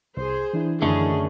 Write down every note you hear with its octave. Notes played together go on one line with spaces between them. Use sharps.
C2 G#4 C5
E3 D4 E4
F#2 D3 D#3 A3 G#4 A#4 C#6